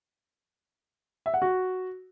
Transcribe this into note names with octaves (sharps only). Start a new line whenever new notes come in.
E5
F#5
F#4